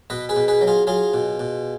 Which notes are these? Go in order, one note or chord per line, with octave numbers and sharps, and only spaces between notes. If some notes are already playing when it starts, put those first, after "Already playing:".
B2 B4 D#5
G#4 B4
B2
G#4 B4
F#3
F4 G#4
F#3 F4 G#4
B2
B2